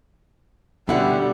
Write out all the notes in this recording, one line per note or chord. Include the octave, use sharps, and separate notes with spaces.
B2 D3 G3 C#4 E4 F#5